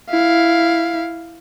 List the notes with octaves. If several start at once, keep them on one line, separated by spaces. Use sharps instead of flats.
E4 F5